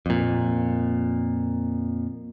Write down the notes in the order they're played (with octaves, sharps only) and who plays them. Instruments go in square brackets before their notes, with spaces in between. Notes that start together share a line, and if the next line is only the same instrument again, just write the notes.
[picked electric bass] F2 A#2